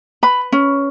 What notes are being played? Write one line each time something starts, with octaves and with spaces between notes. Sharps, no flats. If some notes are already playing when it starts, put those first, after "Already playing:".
B4 B5
C#4